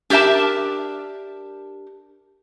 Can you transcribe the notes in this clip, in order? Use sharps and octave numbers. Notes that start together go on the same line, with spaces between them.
D4 G4 A#4 E5 A5